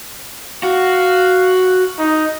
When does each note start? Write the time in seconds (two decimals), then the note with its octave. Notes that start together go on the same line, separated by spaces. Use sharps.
0.63 F#4 F5
1.98 D#4